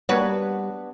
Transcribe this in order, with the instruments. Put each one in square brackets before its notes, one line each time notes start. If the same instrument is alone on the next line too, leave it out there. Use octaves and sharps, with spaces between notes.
[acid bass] G3 [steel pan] A#3 C#5 [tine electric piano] B3 D4 [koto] F#4 B4